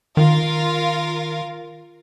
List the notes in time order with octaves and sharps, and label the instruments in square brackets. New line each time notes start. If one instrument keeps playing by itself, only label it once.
[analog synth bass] D#3 [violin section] F4 A#4 F5